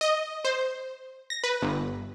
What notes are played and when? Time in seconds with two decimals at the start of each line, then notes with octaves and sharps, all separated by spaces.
0.01 D#5
0.45 C5
1.30 A#6
1.44 B4
1.62 G1